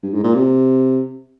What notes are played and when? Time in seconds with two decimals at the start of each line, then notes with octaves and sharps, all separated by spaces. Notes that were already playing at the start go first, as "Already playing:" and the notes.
0.03 G2
0.14 G#2
0.24 A#2
0.34 C3